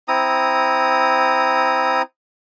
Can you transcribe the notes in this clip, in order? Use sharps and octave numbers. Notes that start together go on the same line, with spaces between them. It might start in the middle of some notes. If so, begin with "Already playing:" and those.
C4 E4 A#5 D#6